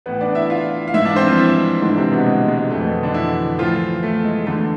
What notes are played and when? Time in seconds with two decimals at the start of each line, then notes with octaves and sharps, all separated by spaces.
0.06 A2 E3 B3 B4
0.21 D4 D5
0.35 E4 E5
0.50 F4 F5
0.88 F5
0.94 G#2 E3 E4 E5
1.05 D4 D5
1.16 C4 C5
1.27 F3 F4
1.38 E3 E4
1.82 G#2 D3 E3 D4
1.97 C3 C4
2.12 B2 B3
2.26 G#3
2.48 G#3
2.70 F2 E3 A3
2.81 B2 B3
3.03 D3 D4
3.14 E3 E4
3.58 A2 E3 F3 F4
4.03 A3
4.24 G#3
4.47 E2 D3 A3